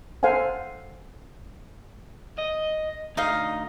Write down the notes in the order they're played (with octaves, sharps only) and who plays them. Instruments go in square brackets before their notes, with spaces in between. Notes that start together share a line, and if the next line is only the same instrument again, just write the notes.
[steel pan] A4 C5 F5 F#5 G#5
[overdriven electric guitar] D#5
[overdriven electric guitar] D2 [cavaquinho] D#4 D#5 F5